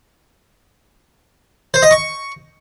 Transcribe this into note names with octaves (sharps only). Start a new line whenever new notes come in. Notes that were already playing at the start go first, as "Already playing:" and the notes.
C5
D#5
C#6